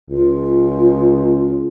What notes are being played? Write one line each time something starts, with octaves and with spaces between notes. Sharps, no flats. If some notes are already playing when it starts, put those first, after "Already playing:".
C#2 F4